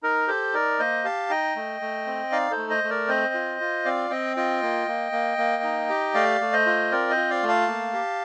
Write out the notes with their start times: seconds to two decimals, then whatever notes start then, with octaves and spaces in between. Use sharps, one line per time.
0.03 D#4 A#4
0.28 G4 A4 C5
0.53 D#4 A#4 D5
0.79 A#3 C5 D#5
1.04 G4 F5 A5
1.30 D#4 D#5 G5
1.56 A3
1.81 A3
2.06 C4
2.32 D#4 D5 F5
2.51 A4 C5
2.57 A3
2.70 C5 D#5
2.84 A3
2.90 A#4 D5
3.08 C4 C5 D#5
3.34 F4
3.60 F4
3.85 C4 D5 F5
4.10 C4 D#5 G5
4.37 F4 D#5 G5
4.62 A#3
4.88 A#3
5.12 A#3
5.38 A#3
5.63 D#4
5.89 G4
6.14 A3 D5 F5
6.41 A3
6.53 C5 D#5
6.66 F4
6.92 C4 A#4 D5
7.10 C5 D#5
7.17 F4
7.30 D5 F5
7.43 A3
7.48 F5 A5
7.67 A#3
7.93 G4